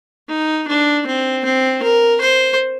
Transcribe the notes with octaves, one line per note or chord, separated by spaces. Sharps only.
D#4
D4
C4
C4
A#4
C5